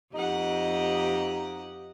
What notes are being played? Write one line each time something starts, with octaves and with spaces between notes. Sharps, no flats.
F2 D#4 G4 D#5 F#5